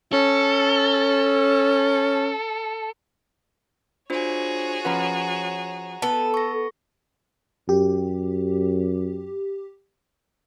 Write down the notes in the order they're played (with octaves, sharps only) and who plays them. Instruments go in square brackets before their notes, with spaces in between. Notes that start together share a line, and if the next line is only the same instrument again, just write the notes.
[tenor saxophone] C#4 [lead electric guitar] A4
[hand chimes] D4 F4 C5 [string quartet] F#4 G#4 C#5
[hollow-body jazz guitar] F3 C#4 B4 [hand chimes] F#5 A#5
[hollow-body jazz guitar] B3 B4 [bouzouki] A4
[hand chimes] C#6 A#6
[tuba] F#2 [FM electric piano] G4